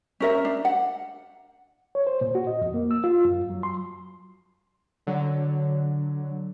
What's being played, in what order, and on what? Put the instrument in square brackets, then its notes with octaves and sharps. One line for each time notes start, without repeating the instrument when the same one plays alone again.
[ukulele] C#4 A#4 E5
D4
F#5
[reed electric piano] C#5
C5
A#2
F#4
D#5
F2
A#3
E6
F4
F#2
F#3
C6
[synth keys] D3 F#3